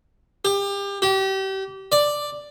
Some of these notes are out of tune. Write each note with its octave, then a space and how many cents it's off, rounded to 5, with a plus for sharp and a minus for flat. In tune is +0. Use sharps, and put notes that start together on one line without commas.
G4 +30
G4 -30
D5 +5